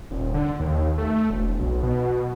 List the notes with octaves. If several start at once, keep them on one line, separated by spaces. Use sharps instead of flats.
D#1
D3
D#2
A3
E1
B1
B2